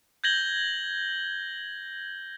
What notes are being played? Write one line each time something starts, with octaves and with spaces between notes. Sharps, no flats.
G6 G#6 A#6 F#7 G7